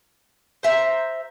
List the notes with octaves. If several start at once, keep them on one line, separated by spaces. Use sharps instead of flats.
C5 E5 A#5